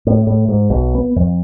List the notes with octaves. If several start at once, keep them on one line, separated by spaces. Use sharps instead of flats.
A2
A2
G#2
B1
B3
F2